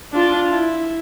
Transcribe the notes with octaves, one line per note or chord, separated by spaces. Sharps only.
D4 F4
E4